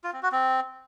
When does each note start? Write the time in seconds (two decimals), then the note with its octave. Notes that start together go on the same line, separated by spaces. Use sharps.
0.04 F4
0.13 C4
0.23 F#4
0.32 C4